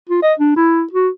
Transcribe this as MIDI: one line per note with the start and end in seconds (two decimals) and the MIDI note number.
0.09 0.22 65
0.22 0.34 75
0.39 0.56 62
0.56 0.83 64
0.93 1.09 66